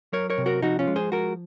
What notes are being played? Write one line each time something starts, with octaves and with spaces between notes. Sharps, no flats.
F#3 A#4 C#5
A#4 C#5
C3
F#4 A#4
F3 D#4 F#4
C#4 F4
G#3
G#4 C5
F3 F#4 A#4